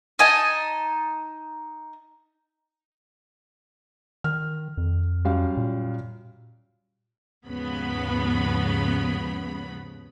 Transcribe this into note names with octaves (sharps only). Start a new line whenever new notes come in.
D#4 D#5 G#5 A5
D#3 F6
F2
F#2 G3 F5
A#2
D#2 G#2 C#3 F3 B3 B5